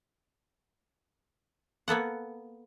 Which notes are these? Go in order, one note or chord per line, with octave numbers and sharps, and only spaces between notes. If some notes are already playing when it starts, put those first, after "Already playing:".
A#3 B3 A4 F#5